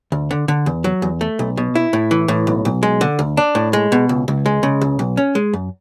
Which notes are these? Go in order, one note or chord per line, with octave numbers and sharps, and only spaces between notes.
D2
D3
D3
E2
F#3
E2
A3
B1
B2
E4
A2
E3
A2
B1
B1
G#3
D3
D2
D4
A2
G#3
B2
C#2
C#2
G#3
C#3
C#2
B1
C#4
G#3
F#2